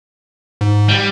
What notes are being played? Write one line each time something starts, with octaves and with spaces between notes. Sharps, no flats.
G#2
G3